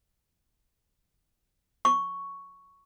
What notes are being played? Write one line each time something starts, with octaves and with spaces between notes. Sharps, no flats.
C#6